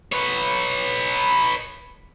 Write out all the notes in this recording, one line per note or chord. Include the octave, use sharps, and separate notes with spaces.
B4 C#5